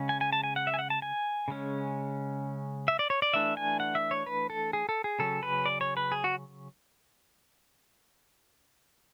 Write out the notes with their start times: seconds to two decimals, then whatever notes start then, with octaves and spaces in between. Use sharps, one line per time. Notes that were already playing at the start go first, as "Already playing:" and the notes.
Already playing: C#3 G#3 C#4
0.09 G#5
0.21 G#5
0.33 A5
0.44 G#5
0.56 F#5
0.67 E5
0.74 G#5
0.79 F#5
0.90 A5
1.02 G#5
1.48 C#3 G#3 C#4
2.88 E5
2.99 D5
3.10 C#5
3.22 D5
3.34 E3 A3 D4 E5
3.57 G#5
3.80 F#5
3.95 E5
4.11 C#5
4.26 B4
4.50 A4
4.73 G#4
4.89 A4
5.04 G#4
5.19 C#3 F#3 C#4 A4
5.43 B4
5.66 D5
5.81 C#5
5.97 B4
6.12 G#4
6.24 F#4